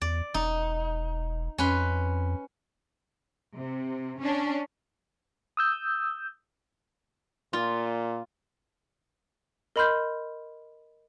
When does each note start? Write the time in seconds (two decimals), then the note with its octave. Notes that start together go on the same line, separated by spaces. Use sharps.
0.01 E2 D5
0.34 E1 D#4
1.58 F2 C#4 B4 C6
3.54 C3
4.19 C#4 D4
5.57 D#6 E6 G6
7.53 A#2 F4
9.76 A#4 D#5 B5 C6 F6 G6